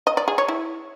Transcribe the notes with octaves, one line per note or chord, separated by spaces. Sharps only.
D#5
D5
G#4
C#5
E4